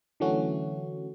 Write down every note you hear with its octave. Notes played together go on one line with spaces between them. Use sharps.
D3 E3 F#3 A3 C#4 F#4